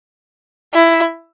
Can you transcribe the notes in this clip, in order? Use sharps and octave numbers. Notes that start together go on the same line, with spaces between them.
E4